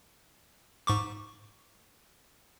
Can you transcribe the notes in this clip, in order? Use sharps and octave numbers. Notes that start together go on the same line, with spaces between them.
G#2 C#6 D6